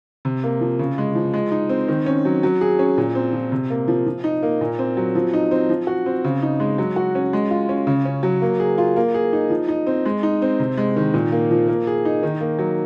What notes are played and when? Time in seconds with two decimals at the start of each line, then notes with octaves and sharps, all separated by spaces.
0.25 C3
0.44 A#3
0.61 F3
0.79 C#3
0.98 G#3
1.15 F3
1.34 G#3
1.51 D#4
1.69 C4
1.88 D#3
2.06 C#4
2.25 F#3
2.43 F#3
2.61 G#4
2.79 C#4
2.98 A#2
3.15 C4
3.33 F3
3.52 C3
3.70 A#3
3.88 F3
4.06 F3
4.24 D#4
4.43 A#3
4.61 A#2
4.79 C4
4.97 F#3
5.15 F3
5.33 D#4
5.51 C4
5.69 F3
5.87 F#4
6.06 C4
6.24 C#3
6.42 D#4
6.60 G#3
6.78 F#3
6.96 F#4
7.15 C#4
7.33 G#3
7.50 F4
7.69 C#4
7.87 C#3
8.05 C#4
8.23 F#3
8.42 A#3
8.60 G#4
8.78 F4
8.96 A#3
9.14 G#4
9.33 D#4
9.50 F3
9.68 D#4
9.87 C4
10.05 G#3
10.23 D#4
10.42 C4
10.60 C3
10.77 G#3
10.96 D#3
11.14 A#2
11.32 A#3
11.51 F3
11.68 A#3
11.87 G#4
12.05 D#4
12.23 D#3
12.40 A#3
12.59 F#3